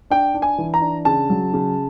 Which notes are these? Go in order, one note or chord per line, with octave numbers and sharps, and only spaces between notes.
D4 G5
D4
G#5
E3
A#5
D4
C#3 A5
F#3
C#3